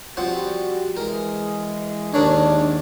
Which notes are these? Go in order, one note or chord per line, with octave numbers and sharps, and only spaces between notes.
F3 G3 C4 F#4 F#5
E3 G#3 A#4
D#2 G#2 D4 A#4 C#5 D5